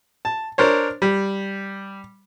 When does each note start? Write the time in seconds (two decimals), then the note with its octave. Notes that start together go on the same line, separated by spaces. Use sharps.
0.25 A5
0.58 D4 A#4 C5 C#5
1.02 G3